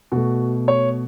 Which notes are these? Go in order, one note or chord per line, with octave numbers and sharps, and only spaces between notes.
B2 A3 F#4
C#5